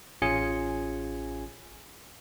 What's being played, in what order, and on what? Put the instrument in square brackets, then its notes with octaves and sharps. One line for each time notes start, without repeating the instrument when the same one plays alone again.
[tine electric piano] A1 C#4 F4 G#4 G#5 C#7